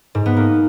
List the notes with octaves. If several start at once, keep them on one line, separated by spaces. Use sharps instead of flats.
G#2
B3
A#3